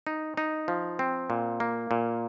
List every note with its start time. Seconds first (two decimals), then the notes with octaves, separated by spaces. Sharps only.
0.07 D#4
0.37 D#4
0.68 F3
0.99 C4
1.30 A#2
1.60 A#3
1.91 A#2